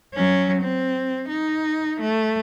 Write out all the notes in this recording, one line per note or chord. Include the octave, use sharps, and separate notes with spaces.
F#3 C#4
C4
D#4
A3